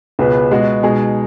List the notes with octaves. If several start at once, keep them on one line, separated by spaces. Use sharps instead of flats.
C#2 B2 B3 G#4 B4
B2 G#3 B3 F#4
B2 G#3 D#4 G#4